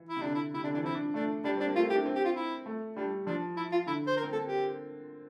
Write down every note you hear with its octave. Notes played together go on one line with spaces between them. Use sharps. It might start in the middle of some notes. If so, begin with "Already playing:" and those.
Already playing: E3
E4
C3
D3 D4
E4
C3 E4
D3 D4
E3 D4
C4 E4
D4
A3 D4
G3 D4
C4 D4
A#3
A3 F4
E4
G4
D4
C4
G4
F4
E4
A3
G3 D4
F3 D4
E4
F4
D3 E4
C5
A#4
C4
A#3 A4
G4